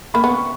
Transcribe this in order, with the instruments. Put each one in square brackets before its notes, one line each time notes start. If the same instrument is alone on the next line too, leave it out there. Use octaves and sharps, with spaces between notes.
[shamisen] A#3 [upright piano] B5
[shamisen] B3
[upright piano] C#6